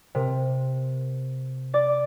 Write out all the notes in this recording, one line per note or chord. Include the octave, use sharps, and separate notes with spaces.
C3 A#4
D5 D6 A6